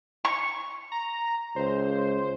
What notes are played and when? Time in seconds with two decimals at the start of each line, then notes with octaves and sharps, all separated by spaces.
0.25 C#6
0.92 A#5
1.56 C#2 C5